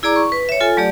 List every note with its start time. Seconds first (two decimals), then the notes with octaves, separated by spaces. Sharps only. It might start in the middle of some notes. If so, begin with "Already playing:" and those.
0.03 E4 G#4 D5 A#5 D6
0.16 C#6
0.32 B4
0.49 C#5 E5
0.61 F4 A4 G#5
0.77 F#3 A3 G4 D5